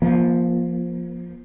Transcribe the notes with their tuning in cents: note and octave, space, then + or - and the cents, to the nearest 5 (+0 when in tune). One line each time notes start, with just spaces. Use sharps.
F3 +0 A#3 +35